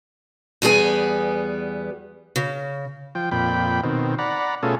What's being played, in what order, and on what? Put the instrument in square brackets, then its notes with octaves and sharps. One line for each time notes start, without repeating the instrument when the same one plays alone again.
[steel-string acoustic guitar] E2 G3 B3 G#4 G#5
C#3
[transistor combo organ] F3 G5
F2 A#2 G5 B5
B2 D#3 C4
D5 F#5 A#5 B5
B2 A3 C#4 F4 G#4 A4